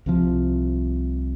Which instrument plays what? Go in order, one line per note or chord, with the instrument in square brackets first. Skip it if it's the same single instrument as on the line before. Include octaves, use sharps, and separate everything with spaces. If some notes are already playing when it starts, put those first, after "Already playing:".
[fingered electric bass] C2 C3 F3